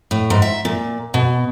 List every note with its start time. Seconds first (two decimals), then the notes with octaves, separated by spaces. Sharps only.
0.11 A2
0.30 G#2
0.42 E5
0.65 A#2
1.14 B2